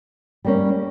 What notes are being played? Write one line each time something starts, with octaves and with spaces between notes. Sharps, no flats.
G3 A#3 C#4